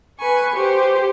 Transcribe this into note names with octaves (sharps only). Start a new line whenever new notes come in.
B4 G#5 C#6
G4 C5